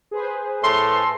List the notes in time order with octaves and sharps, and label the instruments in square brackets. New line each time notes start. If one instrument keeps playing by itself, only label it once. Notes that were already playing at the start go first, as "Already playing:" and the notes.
[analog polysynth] G#4 B4 C5
[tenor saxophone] A2 [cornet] A4 [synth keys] C6